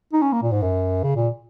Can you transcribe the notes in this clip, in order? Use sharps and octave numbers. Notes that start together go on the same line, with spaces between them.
D#4
C#4
A#3
A#2
G#2
F#2
C#3
A#2